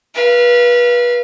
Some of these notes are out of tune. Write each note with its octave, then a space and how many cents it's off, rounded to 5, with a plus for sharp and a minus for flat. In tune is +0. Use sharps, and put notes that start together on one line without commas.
B4 -30 F5 -20